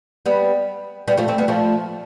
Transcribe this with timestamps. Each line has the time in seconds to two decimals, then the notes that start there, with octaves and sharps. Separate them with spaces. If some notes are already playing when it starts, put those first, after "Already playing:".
0.26 G3 B3
1.08 G3 B3
1.17 F3 A3
1.28 A3 C4
1.38 G3 B3
1.48 F3 A3